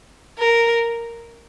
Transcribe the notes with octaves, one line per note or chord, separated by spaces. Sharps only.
A#4